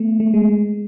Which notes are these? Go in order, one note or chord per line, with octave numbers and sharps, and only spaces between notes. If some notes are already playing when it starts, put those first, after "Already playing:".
Already playing: A3 B3
A3
G#3